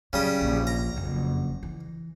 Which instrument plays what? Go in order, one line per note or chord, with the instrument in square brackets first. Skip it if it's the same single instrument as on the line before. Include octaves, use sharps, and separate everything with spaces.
[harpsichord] C#3 G3 D#6 [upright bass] F#3
[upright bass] A#1
[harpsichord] A#5
[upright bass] F#1 F2
E3